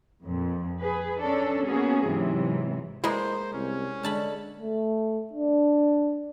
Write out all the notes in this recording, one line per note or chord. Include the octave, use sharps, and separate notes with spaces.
F2 A#2
G#4 B4
C#4 D4 A4
A#3 B3 C#4 F#4 G#4
G#2 C3 E3 F#3
G#3 A#3 E4 B4 C5 D#5
C2 C#4
D3 G#3 A5 B5
A3
D4